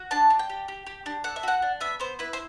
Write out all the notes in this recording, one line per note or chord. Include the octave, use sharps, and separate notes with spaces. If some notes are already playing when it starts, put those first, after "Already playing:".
Already playing: F#4
D4 A5
D4
G5
G4
G4
G4
D4
A4 F#5
E5
F#4 F#5
D4
B3 E5
B3 C5
E4 B4
C5